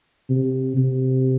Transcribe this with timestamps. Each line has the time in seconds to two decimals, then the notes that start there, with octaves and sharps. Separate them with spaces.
0.30 C3
0.77 C3